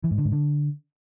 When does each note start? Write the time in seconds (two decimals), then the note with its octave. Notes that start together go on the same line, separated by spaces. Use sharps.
0.04 E3
0.11 G#2
0.18 D3
0.25 G#2
0.32 D3